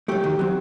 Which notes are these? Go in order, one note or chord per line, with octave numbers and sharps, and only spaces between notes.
F#3 A3 G4
D#3
F#3 C4